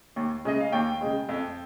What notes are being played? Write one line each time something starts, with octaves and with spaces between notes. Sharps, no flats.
D#2
C#3 G#3 D#5
F5
D#2 G5
C#3 G#3
F2